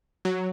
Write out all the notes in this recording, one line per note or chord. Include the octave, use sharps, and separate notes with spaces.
F#3